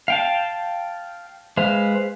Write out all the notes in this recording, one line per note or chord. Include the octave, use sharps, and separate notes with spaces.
F5 G5 A5
G#3 B4 C5 F5